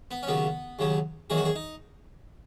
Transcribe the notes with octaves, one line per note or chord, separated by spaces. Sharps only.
B3
C#4
D#2 C#3 F#3 B3
D#2 C#3 F#3
E2 D#3 F#3 G#4
F#4
G#4
D#4